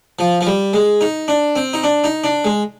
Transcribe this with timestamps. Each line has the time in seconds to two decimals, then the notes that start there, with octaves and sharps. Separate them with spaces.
0.19 F3
0.41 F3
0.47 G3
0.74 G#3
1.01 D#4
1.28 D4
1.56 C4
1.73 D#4
1.83 D4
2.04 D#4
2.24 D4
2.45 G#3